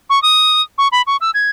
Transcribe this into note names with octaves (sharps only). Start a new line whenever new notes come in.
C#6
D#6
C#6
B5
C#6
E6
G#6